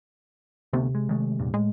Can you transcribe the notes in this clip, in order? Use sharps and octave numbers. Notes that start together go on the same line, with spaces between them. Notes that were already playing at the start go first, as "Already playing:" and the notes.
D2 C3 A3 B3
G#3
D#3 G#3 A3
E2 G2 A#2
A2 G#3